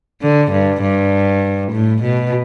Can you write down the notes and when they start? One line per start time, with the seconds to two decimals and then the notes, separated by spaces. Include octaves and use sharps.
0.22 D3
0.52 G2
0.82 G2
1.72 A2
2.03 B2